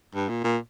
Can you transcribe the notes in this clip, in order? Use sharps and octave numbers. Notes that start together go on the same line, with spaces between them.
G2
A#2
A#2